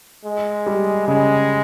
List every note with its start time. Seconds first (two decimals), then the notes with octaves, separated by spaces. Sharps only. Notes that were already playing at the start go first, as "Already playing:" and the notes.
0.25 G#3
0.66 G3
1.08 C#3 G#3